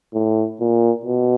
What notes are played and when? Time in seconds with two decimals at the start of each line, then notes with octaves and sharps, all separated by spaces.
0.13 A2
0.60 A#2
1.05 B2